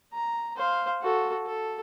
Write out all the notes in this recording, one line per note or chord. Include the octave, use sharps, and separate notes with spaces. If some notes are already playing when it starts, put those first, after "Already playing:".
A#5
C5 F5
F#4 A4
A4